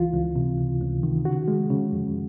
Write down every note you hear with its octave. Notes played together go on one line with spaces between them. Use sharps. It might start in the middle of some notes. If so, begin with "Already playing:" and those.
Already playing: C#2 E3 F4
C#2
C3
C#2
C#2
D#3
C#3 F#4
G#3
C#3
F2